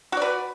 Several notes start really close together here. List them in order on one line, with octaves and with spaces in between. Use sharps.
F#4 D5 B4